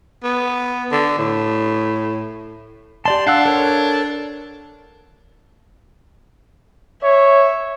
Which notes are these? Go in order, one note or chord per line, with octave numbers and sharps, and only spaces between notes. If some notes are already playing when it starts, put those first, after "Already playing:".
B3
D3
A2
G4 D5 A5 C6
D4 F5 F#5 E6
A4 A#4 C#5
C#5 E5